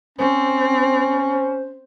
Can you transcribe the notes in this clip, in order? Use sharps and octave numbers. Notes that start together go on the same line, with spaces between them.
C4 C#4 C5